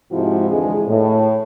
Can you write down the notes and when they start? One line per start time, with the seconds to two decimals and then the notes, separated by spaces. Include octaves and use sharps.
0.12 G#2 C3 F3 E4 F#4
0.50 F2 D3 E3 G#3 G#4
0.87 A2